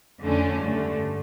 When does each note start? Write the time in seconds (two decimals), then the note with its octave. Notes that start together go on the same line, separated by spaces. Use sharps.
0.22 F2 D3 A3 C#4
0.63 G2 D3 A3